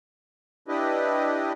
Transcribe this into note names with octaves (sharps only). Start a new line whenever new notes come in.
D4 E4 G4 B4 D#5